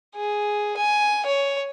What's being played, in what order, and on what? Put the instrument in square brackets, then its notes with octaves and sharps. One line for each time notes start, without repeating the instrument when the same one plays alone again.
[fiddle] G#4
G#5
C#5